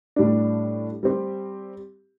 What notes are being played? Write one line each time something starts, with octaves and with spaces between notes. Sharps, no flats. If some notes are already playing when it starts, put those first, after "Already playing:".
A2 G3 D4
G3 C4 G4